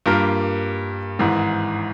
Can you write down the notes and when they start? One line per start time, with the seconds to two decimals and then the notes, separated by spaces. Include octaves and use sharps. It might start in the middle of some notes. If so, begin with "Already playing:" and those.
0.06 G2 G3 A#3 F4 A#4
1.19 G#1 G#2 E3